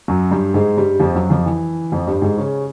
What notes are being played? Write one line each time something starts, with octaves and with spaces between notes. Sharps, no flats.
F#2 F#3
G2 G3
G#2 G#3
G2 G3
F2 F3
F#2 F#3
F2 F3
E3
F2 F3
G2 G3
G#2 G#3
C#3 C#4